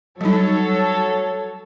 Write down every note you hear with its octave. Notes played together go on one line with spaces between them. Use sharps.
F#3 G3 D#4 A4 C#5